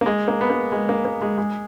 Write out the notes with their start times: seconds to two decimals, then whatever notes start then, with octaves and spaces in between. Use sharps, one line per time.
0.01 A#3
0.06 G#3
0.28 A#3
0.41 B3
0.50 A#3
0.72 G#3
0.89 A#3
1.05 A#3
1.21 G#3
1.38 G#3